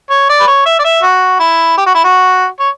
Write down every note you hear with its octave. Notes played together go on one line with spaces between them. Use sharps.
C#5
D5
B4
C#5
E5
D5
E5
F#4
E4
G4
F#4
E4
F#4
C#5